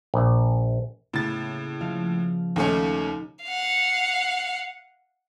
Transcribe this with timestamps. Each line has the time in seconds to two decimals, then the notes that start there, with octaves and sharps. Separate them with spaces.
0.14 A#1
1.13 A2 C#3 A#3 B3 A6
1.81 F3 F5
2.56 D#2 A3 C#4 D#4
3.44 F5 F#5